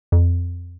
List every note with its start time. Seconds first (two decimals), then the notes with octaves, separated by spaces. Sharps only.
0.12 F2